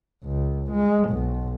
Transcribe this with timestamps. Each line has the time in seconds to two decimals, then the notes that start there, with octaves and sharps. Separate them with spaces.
0.24 C#2
0.71 G#3
1.09 B1